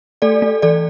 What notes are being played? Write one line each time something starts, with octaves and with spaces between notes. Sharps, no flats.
A3 A4 D5
A3
E3 A4 D5